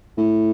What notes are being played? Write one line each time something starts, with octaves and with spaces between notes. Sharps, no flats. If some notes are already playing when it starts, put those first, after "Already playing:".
A2